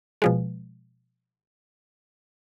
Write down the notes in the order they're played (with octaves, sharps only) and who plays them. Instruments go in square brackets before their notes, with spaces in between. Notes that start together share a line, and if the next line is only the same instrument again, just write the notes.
[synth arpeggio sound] B2 F3 G#3